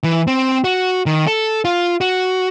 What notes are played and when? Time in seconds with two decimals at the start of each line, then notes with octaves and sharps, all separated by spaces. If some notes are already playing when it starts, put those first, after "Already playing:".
0.04 E3
0.27 C4
0.64 F#4
1.06 D#3
1.27 A4
1.65 F4
2.01 F#4